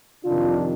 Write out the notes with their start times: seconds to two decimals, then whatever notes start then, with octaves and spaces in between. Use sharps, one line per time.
0.25 F2 C3 D#3 D4 F4